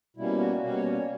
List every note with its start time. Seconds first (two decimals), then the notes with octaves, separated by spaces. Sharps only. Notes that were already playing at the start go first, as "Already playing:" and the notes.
0.16 B2 G3 A#3 C#4 E4
0.39 F#4
0.62 B2 G3 A#3 C#4 F#4
0.76 C#5
0.92 C#5